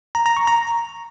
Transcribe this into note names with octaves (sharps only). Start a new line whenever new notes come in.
A#5
A#5
C#6
A#5